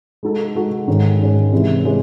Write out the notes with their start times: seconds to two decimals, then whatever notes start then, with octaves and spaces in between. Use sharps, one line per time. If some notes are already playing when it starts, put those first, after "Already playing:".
0.23 G#3 D#4 F#4 A4
0.55 G#3 D#4 F#4 A4
0.87 G#2 D#3 G#3 C#4
1.20 G#2 D#3 G#3 C#4
1.53 C3 E3 G#3 C#4 E4
1.84 C3 E3 G#3 C#4 E4